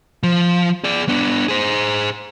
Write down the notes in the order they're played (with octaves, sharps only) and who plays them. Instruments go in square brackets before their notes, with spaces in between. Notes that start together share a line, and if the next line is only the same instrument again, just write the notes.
[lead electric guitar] F3
G#4 D5
B3 D4
G#4 C5